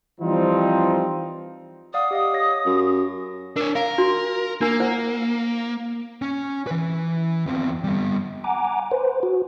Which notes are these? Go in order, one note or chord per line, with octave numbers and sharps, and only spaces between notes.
E3 F3 G3 C4 D#4 F4
D5 F5 F#5 D#6
G4 D#5 F5
C#5 A#6
F#2
D4 A#4 C#5
A#4 F5
D4 F#4 C6
A#3 D4 A#4 G#5
E4 C5 F#5
C#4
E3 B4
E2 C4
G3 B3
F#5 G#5 A#5 D6
B4 C5
F#4